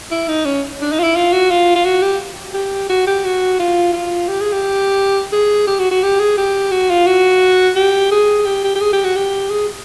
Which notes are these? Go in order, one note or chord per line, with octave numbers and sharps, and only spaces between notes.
E4
D#4
C#4
D4
D#4
F4
E4
F4
F#4
F4
F4
F#4
G4
G4
F#4
G4
F#4
F4
F4
G4
G#4
G4
G#4
G4
F#4
F#4
G4
G#4
G4
F#4
F4
F#4
G4
G#4
G4
G4
G4
G#4
G4
F#4
G4
G#4